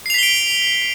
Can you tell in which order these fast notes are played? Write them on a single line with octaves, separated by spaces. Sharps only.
C7 F7 B6 G7 D7